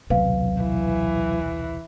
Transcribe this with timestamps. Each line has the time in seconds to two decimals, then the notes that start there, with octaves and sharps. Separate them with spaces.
0.10 D#1 B1 C3 F#3 B4 F5
0.63 E3